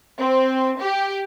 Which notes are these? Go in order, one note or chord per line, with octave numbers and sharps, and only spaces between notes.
C4
G4